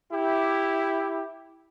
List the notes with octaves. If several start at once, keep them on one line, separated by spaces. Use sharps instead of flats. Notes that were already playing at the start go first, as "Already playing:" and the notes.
E4 G4